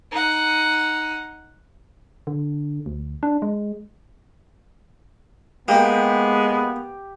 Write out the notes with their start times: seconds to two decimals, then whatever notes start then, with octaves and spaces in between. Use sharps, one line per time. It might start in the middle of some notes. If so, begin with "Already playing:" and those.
0.12 D#4 F#5
2.27 D3
2.86 D2
3.23 D4
3.42 G#3
5.68 G#3 A#3 B3 D#4 G4